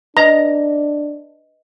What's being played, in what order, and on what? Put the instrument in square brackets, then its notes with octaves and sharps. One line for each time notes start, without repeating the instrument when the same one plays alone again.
[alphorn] D4 [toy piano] B4 D#5 [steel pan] A#5